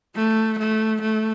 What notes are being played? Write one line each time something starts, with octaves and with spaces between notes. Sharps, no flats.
A3
A3
A3